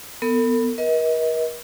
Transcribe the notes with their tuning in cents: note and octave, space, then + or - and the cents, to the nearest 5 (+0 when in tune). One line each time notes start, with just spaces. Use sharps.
B3 +0 A4 +45
A#4 +45 D#5 +35